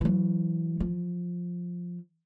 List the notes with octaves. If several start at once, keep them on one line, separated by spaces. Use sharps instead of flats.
E3 F#3
F3